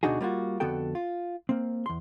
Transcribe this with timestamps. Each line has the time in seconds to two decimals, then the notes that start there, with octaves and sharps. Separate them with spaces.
0.03 D2 B2 D4 D#4 F#4 G#4
0.21 G3 A#3 F4 F#4
0.60 F2 D3 B3 F#4 A4 G5
0.95 F4
1.49 A#3 C4
1.86 E2 C6